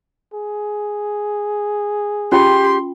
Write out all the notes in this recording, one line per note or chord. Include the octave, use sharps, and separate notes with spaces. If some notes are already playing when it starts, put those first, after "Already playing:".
G#4
C#4 F4 G4 G5 C6